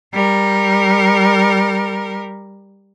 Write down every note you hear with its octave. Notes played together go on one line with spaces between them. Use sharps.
G3 A#4